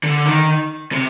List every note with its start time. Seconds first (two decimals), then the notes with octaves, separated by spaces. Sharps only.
0.03 D3
0.26 D#3
0.92 C3